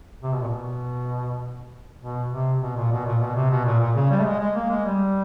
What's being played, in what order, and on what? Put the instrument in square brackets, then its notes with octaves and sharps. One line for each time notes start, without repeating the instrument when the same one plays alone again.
[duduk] C3
B2
A#2
B2
B2
C3
B2
A#2
B2
A#2
B2
C3
B2
A#2
A#2
C#3
G3
A3
G#3
G#3
A#3
G#3
G3